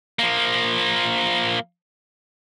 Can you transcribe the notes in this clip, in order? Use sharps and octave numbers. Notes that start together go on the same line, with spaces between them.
F3 A#3